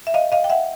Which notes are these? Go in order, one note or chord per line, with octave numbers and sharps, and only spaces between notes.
E5
D#5 F5
D#5 F5
G5
E5 F#5